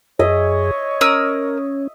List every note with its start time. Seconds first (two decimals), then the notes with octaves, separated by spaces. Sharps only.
0.19 F#2 G#4 C#5 D#5 E5
1.01 C#4 A#4 D#6 E6